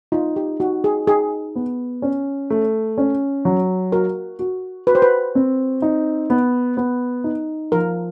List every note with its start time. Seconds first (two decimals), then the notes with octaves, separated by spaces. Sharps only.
0.12 D#4 F4
0.36 G4
0.60 D#4 F#4
0.84 G#4
1.07 D#4 G#4
1.55 B3
2.02 C#4
2.50 A3
2.98 C#4
3.45 F#3
3.92 F#4 A#4
4.39 F#4
4.87 F#4 B4
4.95 C5
5.02 B4
5.35 C4
5.82 D#4
6.30 B3
6.77 B3
7.24 D#4
7.72 F3 A#4